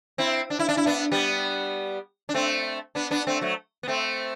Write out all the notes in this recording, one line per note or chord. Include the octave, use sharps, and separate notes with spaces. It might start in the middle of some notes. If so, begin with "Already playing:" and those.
C4 E4
D4
E4
D4
E4
B3 D4
G3 B3
D4
A3 C4
B3 D4
B3 D4
A3 C4
F#3 A3
B3
A3 C4